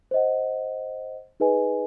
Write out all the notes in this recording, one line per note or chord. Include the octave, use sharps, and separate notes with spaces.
C5 D#5 F#5
D#4 G#4 B4 D#5 G#5